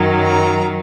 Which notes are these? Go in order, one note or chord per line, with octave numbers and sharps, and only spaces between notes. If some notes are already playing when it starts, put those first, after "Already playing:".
Already playing: F#2 D#3 F#3
A#5